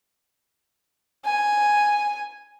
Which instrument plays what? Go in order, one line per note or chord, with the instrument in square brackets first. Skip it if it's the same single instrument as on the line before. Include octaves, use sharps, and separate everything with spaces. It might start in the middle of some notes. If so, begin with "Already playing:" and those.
[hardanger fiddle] G#5